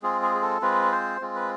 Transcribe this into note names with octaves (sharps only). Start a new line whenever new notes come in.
G#3 C4 F4 G#4
G#4
G#4
A4
G#3 C4 F4 B4
C5
G#3 C4 F4
B4